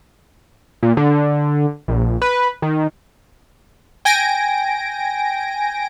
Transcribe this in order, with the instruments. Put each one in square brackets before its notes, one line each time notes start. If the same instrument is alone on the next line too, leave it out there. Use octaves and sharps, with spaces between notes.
[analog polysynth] A#2
D3
A#1
B4
D#3
G5 G#5 A#6 D7